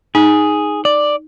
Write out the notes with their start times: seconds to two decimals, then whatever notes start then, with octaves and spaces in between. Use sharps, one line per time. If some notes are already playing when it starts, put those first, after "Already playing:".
0.15 D#4 G#4
0.85 D5